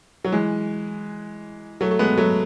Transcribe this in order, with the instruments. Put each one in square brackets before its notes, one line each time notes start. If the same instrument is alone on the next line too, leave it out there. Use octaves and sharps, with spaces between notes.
[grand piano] F#3
E3 G#3
F#3 A3
A3
G#3 B3
F#3 A3